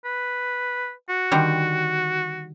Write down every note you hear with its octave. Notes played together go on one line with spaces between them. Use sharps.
B4
F#4
D3 D#3 G3